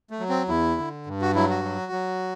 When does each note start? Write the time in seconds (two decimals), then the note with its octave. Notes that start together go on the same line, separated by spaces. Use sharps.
0.11 A3
0.20 F#3
0.29 C4
0.48 E2 E4
0.78 D3
1.06 G2
1.21 F#4
1.35 F#3 E4
1.50 F#4
1.64 F#3
1.92 F#3